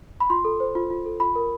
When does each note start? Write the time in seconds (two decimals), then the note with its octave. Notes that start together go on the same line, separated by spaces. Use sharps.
0.20 B5
0.30 F4 C6
0.45 A4
0.60 C5
0.75 F4
0.91 F4
1.06 A4
1.20 F4 B5
1.35 A#4